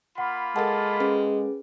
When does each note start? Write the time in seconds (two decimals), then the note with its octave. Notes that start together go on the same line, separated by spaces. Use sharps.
0.18 A#3 F4 F#5 B5
0.56 G#3 A4 A#4 F#5 A5 A6
1.00 C#4 G#4 B4